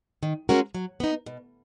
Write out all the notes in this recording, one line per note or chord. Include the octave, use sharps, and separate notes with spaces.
D#3
G#3 C#4 F#4 A#4
F#3
B3 D#4
B2